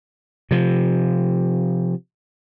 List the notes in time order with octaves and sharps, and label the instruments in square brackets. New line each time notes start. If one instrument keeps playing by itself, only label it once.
[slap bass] C3 F3